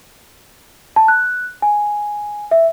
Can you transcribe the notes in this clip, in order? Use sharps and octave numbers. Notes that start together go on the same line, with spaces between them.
A5
F#6
G#5
E5